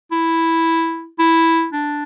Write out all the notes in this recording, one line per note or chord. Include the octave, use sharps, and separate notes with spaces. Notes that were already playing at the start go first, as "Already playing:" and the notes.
E4
E4
D4